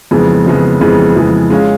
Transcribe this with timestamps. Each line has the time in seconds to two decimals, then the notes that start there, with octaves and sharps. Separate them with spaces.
0.11 F2 C#3 E3 G#3 B3
0.46 F2 C#3 E3 G#3 B3
0.80 F2 C#3 E3 G#3 B3
1.15 F2 C#3 E3 G#3 B3
1.50 G#3 C#4 F4